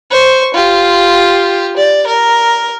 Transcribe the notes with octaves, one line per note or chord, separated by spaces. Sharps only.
C5 C#6
F4 G4
D5
A#4